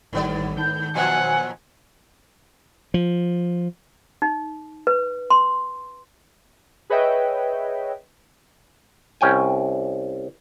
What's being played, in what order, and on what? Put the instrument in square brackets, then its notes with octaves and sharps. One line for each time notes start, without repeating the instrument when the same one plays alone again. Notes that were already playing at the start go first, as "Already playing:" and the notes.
[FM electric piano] A1 D#3 G3 [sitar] G#2 B3 D5
[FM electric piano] D#3 A5 [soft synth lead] G6
[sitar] A#2 F3 F#3 [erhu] F#5 [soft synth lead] G#5
[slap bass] F3
[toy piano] D#4
B4
C6
[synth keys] G#4 B4 C#5 D#5 E5 G5
[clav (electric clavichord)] C2 C#4 G5 G#5